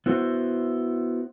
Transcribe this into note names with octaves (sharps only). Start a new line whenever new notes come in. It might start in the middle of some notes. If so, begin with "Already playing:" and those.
B3 E4 F#4 C5